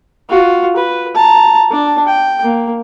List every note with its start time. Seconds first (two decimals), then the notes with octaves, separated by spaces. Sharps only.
0.30 F4 F#4
0.77 B4
1.15 A5 A#5
1.71 D4 A5
2.06 G5
2.44 A#3